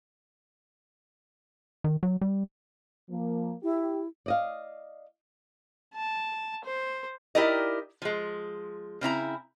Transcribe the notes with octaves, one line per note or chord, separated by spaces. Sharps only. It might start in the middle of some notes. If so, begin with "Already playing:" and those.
D#3
F#3
G3
F3 A#3
E4 G4
D5 D#5 F5
A5
C5
D#4 E4 G4 A#4 D5 D#5
F3 G#3
C#3 C4 E4 A#5